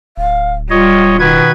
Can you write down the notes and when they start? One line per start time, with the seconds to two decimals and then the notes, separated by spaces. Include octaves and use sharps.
0.17 D1 F5
0.70 G3 F4 C#5 D#5
1.19 B2 D#3 B4 G#6